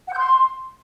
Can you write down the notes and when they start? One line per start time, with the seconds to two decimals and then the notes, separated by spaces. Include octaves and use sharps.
0.07 F#5
0.13 G6
0.18 C6